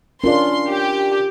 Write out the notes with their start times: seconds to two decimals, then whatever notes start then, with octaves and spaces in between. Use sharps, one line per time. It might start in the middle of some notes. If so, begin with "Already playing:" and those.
0.24 C#4 D4 F4 A#4 C6
0.69 G4